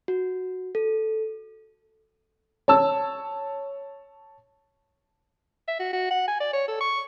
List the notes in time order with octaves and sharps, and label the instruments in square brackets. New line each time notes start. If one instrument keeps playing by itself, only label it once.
[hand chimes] F#4
A4
[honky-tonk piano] C#5 A5 E6
[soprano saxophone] E5
F#4
F#4
F#5
G#5
D5
C#5
A4
C#6